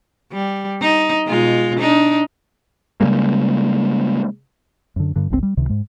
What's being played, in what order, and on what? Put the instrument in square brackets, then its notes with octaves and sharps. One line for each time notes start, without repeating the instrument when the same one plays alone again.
[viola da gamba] G3
D#4
B2 G#3 F4
D4 D#4
[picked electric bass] C#3 G3 G#3 A#3
[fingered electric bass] F#2 D3
G2 D3
G1 C#2 A#2 C4
G3
C#2 C3 D#3
G#2 G#3